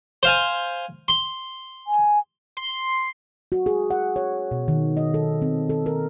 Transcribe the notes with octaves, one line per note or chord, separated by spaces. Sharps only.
C5 F5 G#5
C6
G#5
C6
F#4
G#4
F#5
C#5
B2
D#3
D#5
A4
C4
A4
A#4